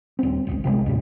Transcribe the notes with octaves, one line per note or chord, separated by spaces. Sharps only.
D#1 C4
D#1 G#1 C#2
B1 C3 E3 G#3
D#2 A2 C3